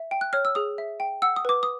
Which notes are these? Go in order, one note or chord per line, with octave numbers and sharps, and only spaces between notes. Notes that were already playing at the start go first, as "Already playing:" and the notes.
Already playing: E5
G5
F#6
C#5 F6
E6
G#4 D#6
E5
G5
F#5 E6
D#6
B4 D6
D#6